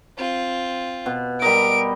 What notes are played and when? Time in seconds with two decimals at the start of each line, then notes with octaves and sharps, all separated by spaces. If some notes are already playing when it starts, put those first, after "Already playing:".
0.18 C4 F4
1.06 B2
1.42 G3 A#4 D#5 D7